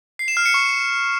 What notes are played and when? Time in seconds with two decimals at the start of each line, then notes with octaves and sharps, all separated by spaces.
0.19 C7
0.28 E7
0.37 F6
0.45 C#7
0.54 C#6